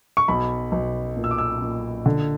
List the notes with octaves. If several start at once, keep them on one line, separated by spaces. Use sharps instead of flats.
C#6
B1 B5
B1
A#2
E6
D6
E6
A#2
D3